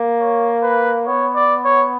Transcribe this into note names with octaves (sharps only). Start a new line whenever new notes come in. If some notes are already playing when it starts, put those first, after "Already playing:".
Already playing: A#3
C#5
B4
B3 C#5
D5
C#5